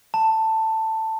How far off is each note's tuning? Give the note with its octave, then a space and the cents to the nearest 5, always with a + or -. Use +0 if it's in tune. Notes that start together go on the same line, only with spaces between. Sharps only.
A5 +10